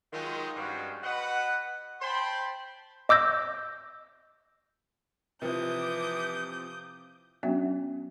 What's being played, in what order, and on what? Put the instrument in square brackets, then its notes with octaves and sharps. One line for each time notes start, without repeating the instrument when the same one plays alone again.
[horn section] D#3 F#3 G#3 D#4 F4
G2 F3 G#3 C#4 F#4
F#4 B4 D#5 F#5
C5 G5 A5 B5 C6
[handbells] D#5 D6 E6 G6 A#6
[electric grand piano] C3 F3 [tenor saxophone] E3 [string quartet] D6 D#6 G6
[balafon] F#3 B3 C#4 D4 F#4 E5